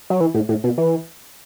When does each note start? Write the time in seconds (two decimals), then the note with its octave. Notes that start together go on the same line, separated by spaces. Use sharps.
0.10 F#3
0.21 E3
0.34 A2
0.49 A2
0.64 B2
0.78 E3